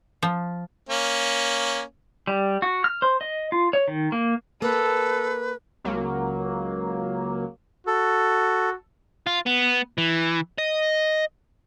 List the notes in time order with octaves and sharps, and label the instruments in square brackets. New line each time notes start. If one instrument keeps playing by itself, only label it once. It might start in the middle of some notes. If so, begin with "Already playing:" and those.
[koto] F3
[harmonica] A#3 C#4
[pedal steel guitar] G3
F#4
F6
C5
D#5
F4
C#5
D#3
A#3
[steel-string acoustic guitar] A#3 [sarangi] A4 [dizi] B4
[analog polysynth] C#2 F#3 A#3
[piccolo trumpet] F#4 [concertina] A4
[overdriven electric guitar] F4
B3
E3
D#5